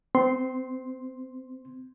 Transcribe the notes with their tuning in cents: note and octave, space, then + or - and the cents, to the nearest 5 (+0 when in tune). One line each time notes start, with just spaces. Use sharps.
C4 -25 C6 +0